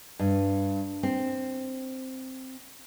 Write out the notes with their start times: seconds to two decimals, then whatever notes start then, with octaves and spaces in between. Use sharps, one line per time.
0.19 G2
1.03 C4